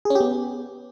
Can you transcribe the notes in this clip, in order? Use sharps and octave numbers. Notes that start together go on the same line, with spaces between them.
G#4
C#4
G4
B3